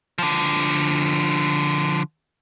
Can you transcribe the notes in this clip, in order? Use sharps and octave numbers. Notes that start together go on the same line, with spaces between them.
D3 F3